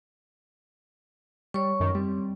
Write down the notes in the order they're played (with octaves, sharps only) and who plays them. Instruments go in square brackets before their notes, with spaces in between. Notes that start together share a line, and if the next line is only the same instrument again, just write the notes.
[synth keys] G3 [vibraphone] C#5 C#6
[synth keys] F#2 D#3
[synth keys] G3 [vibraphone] C4